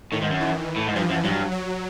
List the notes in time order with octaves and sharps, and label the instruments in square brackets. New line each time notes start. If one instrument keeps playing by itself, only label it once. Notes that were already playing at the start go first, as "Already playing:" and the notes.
[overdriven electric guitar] A2 [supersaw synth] D#3
[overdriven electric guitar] G#2
F#2
[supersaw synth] E3
[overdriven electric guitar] A2
G#2
[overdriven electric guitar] G2 [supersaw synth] F3
[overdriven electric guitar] F#2
[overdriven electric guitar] G2 [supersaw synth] F#3
[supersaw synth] F#3